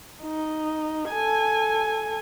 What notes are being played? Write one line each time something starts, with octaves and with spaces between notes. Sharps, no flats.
D#4
A4 G#5